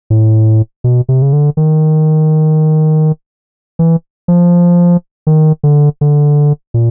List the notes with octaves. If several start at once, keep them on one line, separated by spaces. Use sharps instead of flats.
A2
B2
C3
C#3
D3
D#3
E3
F3
D#3
D3
D3
A#2